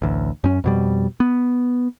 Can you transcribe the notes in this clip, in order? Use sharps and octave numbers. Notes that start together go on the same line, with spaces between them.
A1 D2
F#2 C#4
F2 B2 G3
B3